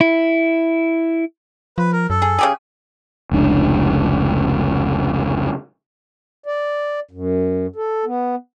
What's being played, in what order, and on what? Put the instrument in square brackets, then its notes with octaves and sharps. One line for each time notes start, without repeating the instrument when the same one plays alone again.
[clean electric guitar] E4
[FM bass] F3 [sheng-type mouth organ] B4
[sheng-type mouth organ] A#4
[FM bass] F#2 [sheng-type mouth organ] A4
[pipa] G#4
C#3 G4 G#4
[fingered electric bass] F1 C#2 D4
[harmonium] D5
F#2
A4
B3